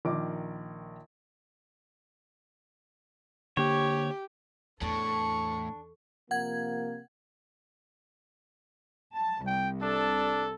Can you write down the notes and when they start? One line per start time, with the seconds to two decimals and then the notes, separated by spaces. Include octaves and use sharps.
0.05 A#1 D#3 A#4 D6
3.57 D3 A#3 G4 C#5
4.81 E2 A2 D4 A4 A5 C#6
6.31 C3 F3 A#3 F#5 G#6
9.15 A5
9.46 C2 G5
9.82 D4 A4